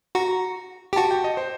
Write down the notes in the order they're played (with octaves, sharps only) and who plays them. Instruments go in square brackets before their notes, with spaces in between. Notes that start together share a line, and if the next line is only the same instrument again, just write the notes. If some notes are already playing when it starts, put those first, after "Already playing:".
[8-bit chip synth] F#4 [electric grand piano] A#5
[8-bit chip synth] G4
[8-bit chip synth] F#4 [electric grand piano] A5
[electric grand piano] G5
D#5
C5